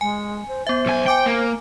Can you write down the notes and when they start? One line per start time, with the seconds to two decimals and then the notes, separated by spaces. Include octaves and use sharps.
0.01 G#3 G#5
0.48 C5
0.67 B3 C5 E5
0.86 B1 G#5
1.06 G5 G#5 D6 D7
1.26 A#3